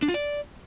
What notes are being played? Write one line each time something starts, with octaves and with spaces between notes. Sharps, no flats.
D4
F4
D5